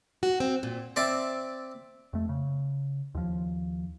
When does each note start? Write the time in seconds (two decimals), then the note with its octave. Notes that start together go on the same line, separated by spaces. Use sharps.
0.23 F#4
0.40 C4
0.63 A#2
0.96 C4 D5 E5 A5
2.13 F2 A3
2.29 C#3
3.15 D#2 F3